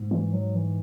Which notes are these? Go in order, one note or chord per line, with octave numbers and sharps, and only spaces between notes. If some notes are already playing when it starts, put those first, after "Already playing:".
Already playing: G#2
E3
F#3
E3